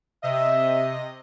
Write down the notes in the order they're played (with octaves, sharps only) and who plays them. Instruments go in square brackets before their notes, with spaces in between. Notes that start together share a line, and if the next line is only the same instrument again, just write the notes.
[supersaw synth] C3 D#5 [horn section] E5